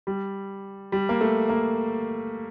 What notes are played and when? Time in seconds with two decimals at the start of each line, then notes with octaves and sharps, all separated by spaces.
0.07 G3
0.92 G3
1.09 A#3
1.21 A3
1.49 A#3